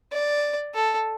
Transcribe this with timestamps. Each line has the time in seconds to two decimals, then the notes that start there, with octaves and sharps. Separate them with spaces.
0.12 D5
0.75 A4